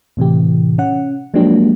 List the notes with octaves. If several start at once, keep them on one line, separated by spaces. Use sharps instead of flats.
A2 C3 E3 G4
C#4 F#5
F3 F#3 G#3 A#3 D4 G4